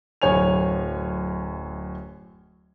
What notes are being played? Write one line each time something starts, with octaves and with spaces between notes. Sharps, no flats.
D1 F#2 C#5 G#5 F7